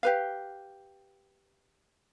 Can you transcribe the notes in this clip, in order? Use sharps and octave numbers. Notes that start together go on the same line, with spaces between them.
G4 B4 F5